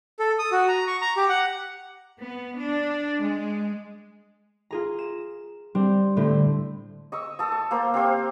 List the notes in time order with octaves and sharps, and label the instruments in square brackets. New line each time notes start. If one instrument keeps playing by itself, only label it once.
[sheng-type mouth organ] A4
D#6
F#4
A#5
C#6
A#5
G4
F#5
[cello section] B3
D4
G#3
[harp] F4 G#4 A#5
E7
G3 C4 D4
A2 D3 A3 C4
[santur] D#5 C#6 E6
A4 A5 D#6
C#6
A#3 A#4 C5
C4 G4 C5 F5